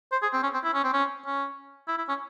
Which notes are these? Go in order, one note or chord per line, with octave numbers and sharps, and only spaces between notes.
C5
G#4
C4
C#4
C4
E4
C#4
C4
C#4
C#4
E4
E4
C#4